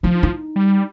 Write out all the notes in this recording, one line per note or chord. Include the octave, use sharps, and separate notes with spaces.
F3 D#4
D#4
G3